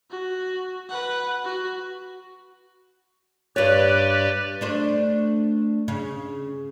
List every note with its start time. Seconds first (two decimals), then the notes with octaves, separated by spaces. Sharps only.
0.11 F#4
0.90 B4 F#5
1.44 F#4
3.56 G2 G4 B4 C#5 D5
4.61 A3 D4 C5
5.88 C#3